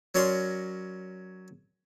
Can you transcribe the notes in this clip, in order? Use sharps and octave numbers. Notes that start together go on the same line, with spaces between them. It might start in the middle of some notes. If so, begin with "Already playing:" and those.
F#3 C#4 A#4 D5 A#5 C6